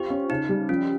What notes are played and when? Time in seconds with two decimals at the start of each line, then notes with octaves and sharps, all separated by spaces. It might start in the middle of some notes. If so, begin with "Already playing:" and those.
Already playing: C4 F4 G4
0.10 C#4
0.30 C#3 D#4
0.49 G3
0.69 F3 C#4